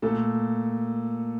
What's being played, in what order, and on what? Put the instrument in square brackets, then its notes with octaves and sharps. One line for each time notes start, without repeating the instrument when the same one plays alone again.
[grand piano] A#2 A3 A4